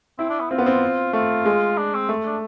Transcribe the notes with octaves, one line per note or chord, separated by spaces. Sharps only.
C4 E4
D4
B3
C4 F4
B3
C4
A3 F4
G#3
D4
C4
A3
D4